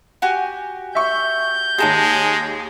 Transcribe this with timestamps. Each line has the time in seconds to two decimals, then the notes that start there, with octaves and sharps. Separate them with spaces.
0.22 F#4 G4 G#5
0.95 E5 C#6 G6
1.78 D#2 G#3 G#4 C#5 A5 A#5